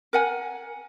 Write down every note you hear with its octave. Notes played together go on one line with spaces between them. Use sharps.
A#4 F#5 G#5